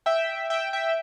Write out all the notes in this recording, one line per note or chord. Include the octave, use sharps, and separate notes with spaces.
E5 G5
E5 G5
E5 G5